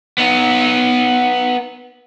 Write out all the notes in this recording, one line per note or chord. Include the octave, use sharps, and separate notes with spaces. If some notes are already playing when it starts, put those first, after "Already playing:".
B3 D#4